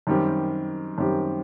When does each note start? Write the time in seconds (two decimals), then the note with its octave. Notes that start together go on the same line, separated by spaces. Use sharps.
0.07 F#2 D#3 G3 C4 G4
0.98 F#2 D#3 G3 C4 G4